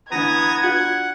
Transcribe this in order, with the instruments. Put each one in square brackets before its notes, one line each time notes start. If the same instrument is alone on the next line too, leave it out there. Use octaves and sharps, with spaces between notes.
[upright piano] A1 D3 E3 [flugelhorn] B3 [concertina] A#5 D#6 [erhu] G#6
[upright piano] D4 F4 F#4 [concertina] F#5